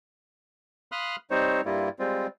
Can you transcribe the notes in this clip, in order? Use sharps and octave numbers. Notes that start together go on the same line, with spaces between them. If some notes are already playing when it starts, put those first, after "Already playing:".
F5 B5 C6 D#6 F6 F#6
G3 C4 D#4 C5 C#5
G2 G3 A#3 E4 F4
G3 G#3 C4 F4